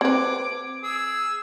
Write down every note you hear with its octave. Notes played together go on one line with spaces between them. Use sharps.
C4 B4 D6 G#6
G#4 E6